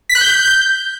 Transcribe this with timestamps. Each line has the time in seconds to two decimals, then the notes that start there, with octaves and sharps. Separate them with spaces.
0.09 B6
0.15 F#6
0.21 G6